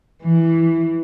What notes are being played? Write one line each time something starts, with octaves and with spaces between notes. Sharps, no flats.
E3